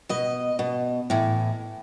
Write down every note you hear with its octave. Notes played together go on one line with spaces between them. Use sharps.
B2 D#5
B2
A2 E3